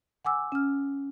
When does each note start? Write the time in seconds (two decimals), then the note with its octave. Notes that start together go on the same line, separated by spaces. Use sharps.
0.25 F#5 G#5 D6 E6
0.52 C#4 F6